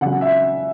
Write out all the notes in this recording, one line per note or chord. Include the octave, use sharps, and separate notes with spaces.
C#3 F#3 F#5
E5